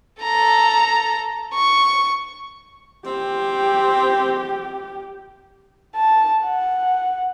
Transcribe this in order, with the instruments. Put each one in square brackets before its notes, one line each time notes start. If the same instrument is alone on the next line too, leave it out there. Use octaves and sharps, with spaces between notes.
[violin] A4 A#5
C#6
[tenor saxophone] C4 [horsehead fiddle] G4
[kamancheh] A5
F#5